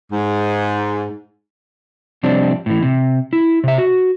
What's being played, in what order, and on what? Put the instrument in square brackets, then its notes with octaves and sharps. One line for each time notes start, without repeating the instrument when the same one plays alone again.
[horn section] G#2
[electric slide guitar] C3 F3 G3 C4 D4
A2 E3
C3
E4
C3 E5
F#4